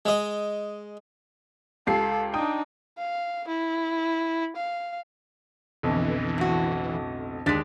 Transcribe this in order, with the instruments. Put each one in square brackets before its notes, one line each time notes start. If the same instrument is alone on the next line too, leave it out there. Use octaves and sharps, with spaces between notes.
[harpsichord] G#3 D#5
[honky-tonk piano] C#2 G4 C7 [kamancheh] A4
[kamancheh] D4 D#4 [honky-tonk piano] G5 D#6
[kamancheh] F5
E4
F5
[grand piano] B1 F2 D3 [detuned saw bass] E3
[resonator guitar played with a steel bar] A2 F#4
[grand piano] D#2 A6 B6 [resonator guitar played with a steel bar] G#3 D4